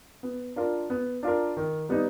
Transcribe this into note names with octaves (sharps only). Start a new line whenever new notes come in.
B3
D4 F4 A#4
B3
D4 F4 A#4
D#3
G3 B3 D#4